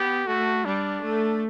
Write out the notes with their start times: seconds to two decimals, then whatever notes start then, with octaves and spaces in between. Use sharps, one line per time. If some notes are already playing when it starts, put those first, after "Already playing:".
Already playing: B3 G4
0.27 A3 F#4
0.65 G3 D4
1.02 A3